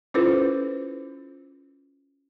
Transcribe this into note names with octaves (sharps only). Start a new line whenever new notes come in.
C#4 E4 F4 A4 B4 C5